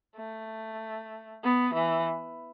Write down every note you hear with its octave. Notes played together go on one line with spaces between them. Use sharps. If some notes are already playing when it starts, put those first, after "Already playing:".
A3
B3
E3